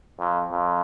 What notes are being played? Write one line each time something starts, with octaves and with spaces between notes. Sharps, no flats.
F2
F2